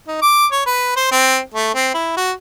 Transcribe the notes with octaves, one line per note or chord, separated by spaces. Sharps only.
D#4
D6
C#5
B4
C5
C4
A3
C4
E4
F#4